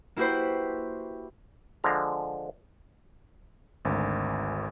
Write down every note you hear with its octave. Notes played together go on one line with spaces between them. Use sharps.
A#3 E4 F#4 G4 B4 C5
D3 F3 G#3 A#5
G#1 D2